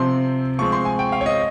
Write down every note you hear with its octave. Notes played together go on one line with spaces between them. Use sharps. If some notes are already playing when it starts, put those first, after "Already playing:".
Already playing: C3 F3 C4 C6
F3 G#3 C4 C#6
C6
G#5
G5
F5
C#5
D#5